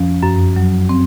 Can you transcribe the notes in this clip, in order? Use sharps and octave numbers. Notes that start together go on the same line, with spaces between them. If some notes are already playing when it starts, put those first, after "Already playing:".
Already playing: F2 F3 C#4
F#2
F#3
C4